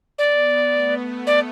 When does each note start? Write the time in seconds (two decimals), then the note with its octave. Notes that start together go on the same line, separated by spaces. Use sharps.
0.18 B3 D5
0.72 A3
1.26 D5